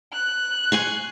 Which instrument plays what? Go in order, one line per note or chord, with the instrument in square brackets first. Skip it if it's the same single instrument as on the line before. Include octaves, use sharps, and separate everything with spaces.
[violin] F#6
[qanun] G#5 C6 C#6